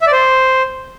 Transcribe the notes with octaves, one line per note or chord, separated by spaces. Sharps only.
E5
D5
C5